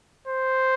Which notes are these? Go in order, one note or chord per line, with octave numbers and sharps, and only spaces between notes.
C5